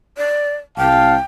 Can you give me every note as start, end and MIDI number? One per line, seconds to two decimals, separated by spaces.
0.18 0.55 74
0.78 1.16 36
0.78 1.16 77
0.78 1.21 79
0.78 1.16 81